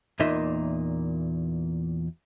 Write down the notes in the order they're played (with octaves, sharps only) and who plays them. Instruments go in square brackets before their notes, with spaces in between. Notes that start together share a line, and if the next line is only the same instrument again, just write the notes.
[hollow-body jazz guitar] E2 A#2 A#3 D#4 E5 C6